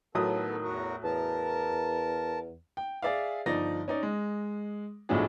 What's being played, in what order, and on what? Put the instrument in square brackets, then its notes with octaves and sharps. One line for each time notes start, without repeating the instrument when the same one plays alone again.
[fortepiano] A2 F#3 D#6 [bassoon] D#3 [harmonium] B3 A4
[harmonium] E2 F#4 A#4
[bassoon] E2 [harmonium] A#4 A5
[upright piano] G5
G#4 D5 E5 F5
G1 F3 D#4 D5 A#6
C#4 D#4 D5
G#3
B1 A2 F3 F#3 D4 G#4